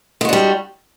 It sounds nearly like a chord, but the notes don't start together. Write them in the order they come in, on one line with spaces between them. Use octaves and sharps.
G#3 F#4 D4 G3